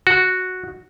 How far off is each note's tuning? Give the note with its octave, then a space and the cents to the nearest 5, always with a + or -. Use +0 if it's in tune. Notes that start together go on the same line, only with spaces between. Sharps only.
F#4 -5